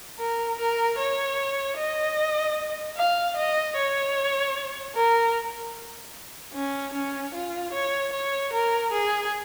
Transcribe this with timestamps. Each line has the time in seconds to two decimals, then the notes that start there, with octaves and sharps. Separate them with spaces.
0.19 A#4
0.59 A#4
0.99 C#5
1.77 D#5
2.97 F5
3.36 D#5
3.76 C#5
4.95 A#4
6.54 C#4
6.94 C#4
7.34 F4
7.73 C#5
8.13 C#5
8.53 A#4
8.92 G#4